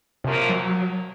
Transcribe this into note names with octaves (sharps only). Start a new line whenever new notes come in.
F#2 C3 F3 A#3
F#3